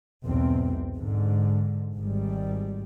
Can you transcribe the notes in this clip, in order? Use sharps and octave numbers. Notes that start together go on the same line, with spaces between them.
B1 E2 G#2 C4
G#2 D3
G#1 G#2 G3